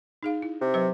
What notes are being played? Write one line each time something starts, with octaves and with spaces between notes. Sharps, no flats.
D#4 G#4 F5
E4
C3
F#3 B4 D#5